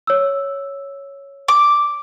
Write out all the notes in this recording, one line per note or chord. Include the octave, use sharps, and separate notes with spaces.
C#5 E6
D6